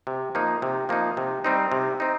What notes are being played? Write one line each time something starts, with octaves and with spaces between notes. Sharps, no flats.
C3
F3 A#3 D#4
C3
F3 A#3 D#4
C3
G3 C4 D#4
C3
C4 D#4